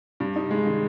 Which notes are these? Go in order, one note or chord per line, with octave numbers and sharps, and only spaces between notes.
G2 C3
D#4
G#3
D#3